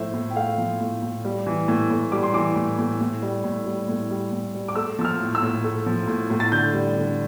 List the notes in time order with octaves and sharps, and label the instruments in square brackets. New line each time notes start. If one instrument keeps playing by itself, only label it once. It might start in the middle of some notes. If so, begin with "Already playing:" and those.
Already playing: [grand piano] A2 F3 A3 C5 E5
A2
G5
A3 F5
F3
A2
A2
G3
E3
A2
A2
G3 D6
C6
E3 D6
A2
A2
A2
G3
A2
G3
A2
G3
A2
G3
D6
A3 E6
F3 E6
F6
A2
E6
A2
A3
F3
A2
A2
A6
D3 G6
G3
D3